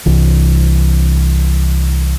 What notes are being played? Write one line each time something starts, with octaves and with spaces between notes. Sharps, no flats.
C2 E3